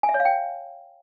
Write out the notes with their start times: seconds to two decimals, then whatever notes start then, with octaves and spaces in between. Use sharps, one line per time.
0.03 G#5
0.09 E5
0.14 C#5
0.20 F5
0.25 G5